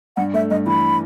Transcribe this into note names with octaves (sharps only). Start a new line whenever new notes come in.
G2 F#5
A3 E5
G2 D#5
E3 B5